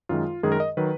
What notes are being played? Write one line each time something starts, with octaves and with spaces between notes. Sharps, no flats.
F#2 D#3 G#3 F4
F#2 D#3 G#3 G#4
A#4
D#5
D#3 F#3 B4